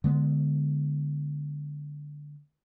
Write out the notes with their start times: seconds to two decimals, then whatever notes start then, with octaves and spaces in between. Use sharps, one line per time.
0.04 D3 G#3 B3